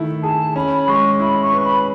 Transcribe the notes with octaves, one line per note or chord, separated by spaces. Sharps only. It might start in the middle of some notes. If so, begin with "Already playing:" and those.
Already playing: D#3 A3 E4
G#4 A5
A5
C#4 B5
B5
G#3 C#6
E4 B5
C#6
B4
B5